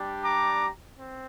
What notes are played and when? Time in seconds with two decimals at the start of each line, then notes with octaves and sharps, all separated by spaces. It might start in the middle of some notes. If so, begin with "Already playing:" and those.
Already playing: G3 D4 G4
0.25 A#5 D6
0.98 C4